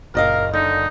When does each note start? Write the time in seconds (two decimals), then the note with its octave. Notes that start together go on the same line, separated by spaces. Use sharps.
0.15 F#1 A#2 A#4 D#5 F5
0.53 D3 D#4